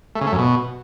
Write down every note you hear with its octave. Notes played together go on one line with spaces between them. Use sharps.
A3
C#3
A3
F#2
B2